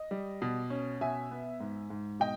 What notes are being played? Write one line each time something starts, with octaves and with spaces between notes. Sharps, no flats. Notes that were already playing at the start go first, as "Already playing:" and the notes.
Already playing: D#5
G3
B2
C#4
B2 E5 G#5
B3
G#2
G#2
B2 D#5 G5